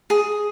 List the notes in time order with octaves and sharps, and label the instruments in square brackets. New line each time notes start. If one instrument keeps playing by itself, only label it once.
[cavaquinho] G#4